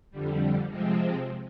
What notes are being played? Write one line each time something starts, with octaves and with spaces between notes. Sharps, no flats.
F2 D3 G3
C3 F3 G#3 C4